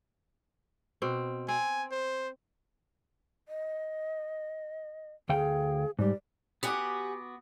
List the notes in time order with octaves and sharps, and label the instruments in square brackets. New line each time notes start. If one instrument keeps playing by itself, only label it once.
[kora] B2 C4
[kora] C4 [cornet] G#5
[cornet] C5
[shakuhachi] D#5
[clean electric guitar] D2 F5 G5 [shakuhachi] G#4
[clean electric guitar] G#2 G3 [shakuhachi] D5
[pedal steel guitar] B3 F#4 D6 [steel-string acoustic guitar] G4 F#5 G#5